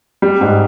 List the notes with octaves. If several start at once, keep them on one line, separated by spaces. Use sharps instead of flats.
G3
G#2